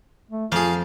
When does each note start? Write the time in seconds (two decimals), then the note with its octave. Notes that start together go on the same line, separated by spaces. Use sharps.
0.31 A3
0.52 F2 F4 G#4 F5